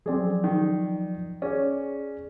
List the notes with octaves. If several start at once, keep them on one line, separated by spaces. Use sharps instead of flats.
F3 F#3 C4 G#4 D5
D#3
C#4 G#4 D5